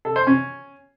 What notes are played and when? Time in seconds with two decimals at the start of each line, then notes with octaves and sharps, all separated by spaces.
0.05 A4
0.16 C5
0.27 C#4